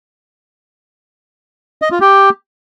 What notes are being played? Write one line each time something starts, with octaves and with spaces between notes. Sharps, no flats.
D#5
F4
G4